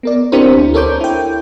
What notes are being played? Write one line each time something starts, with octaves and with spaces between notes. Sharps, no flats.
B3 A#4 D5
C4 D4 E4 G4 A#4 C5
D2
A4 A#4 C5 C#5 D6 G6
E4 G5